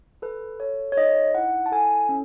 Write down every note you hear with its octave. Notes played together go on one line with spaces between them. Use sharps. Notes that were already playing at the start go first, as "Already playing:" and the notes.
A4 B4
A4 C#5
C#5
D#4 D#5
E4 F#5
A5
A4 G#5
C#4